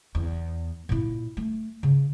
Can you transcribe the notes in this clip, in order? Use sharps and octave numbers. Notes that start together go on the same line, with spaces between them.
E2
A#2 E4
A3
C#3